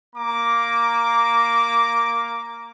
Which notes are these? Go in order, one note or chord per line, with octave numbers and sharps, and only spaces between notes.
A#3 A#5 D6